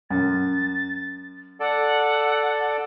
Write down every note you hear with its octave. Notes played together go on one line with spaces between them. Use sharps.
F#2 A6
A4 D5 F#5